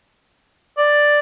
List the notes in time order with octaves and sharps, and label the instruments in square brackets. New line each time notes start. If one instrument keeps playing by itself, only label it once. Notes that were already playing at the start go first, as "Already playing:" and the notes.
[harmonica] D5